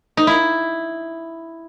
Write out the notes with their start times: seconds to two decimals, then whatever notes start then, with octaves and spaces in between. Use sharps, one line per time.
0.17 D#4
0.27 E4